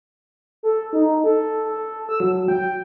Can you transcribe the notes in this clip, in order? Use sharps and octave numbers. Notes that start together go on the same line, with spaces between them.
A4
D#4
A4
A4
E6
F#3
G5